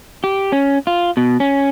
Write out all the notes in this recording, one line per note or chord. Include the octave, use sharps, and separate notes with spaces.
G4
C#4
F4
B2
C#4